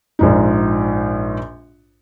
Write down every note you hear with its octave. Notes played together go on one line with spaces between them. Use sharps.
A#1 G#2 D#4